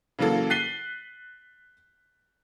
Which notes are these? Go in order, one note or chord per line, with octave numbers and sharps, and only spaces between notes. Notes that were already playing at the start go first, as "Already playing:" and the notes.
C#3 E3 F#3 A#3 A4
F#6 A6 B6 C7 D#7 G7